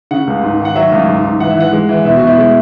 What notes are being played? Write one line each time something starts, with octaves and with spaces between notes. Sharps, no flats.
C#3 F#5
C#2
G#2
D#3
F#5
F#3 E5
C#2
G#2
G#2
E3 F#5
E5
E3 F#5
G#3
E3
B2 E5
F#4
B2
E4
G#3